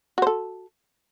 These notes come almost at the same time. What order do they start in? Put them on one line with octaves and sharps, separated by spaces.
F#4 C5 A4